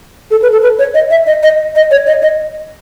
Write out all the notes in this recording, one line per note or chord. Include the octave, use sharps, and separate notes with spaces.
A4
B4
A4
B4
C#5
D#5
E5
D#5
D#5
D#5
C#5
D#5
D#5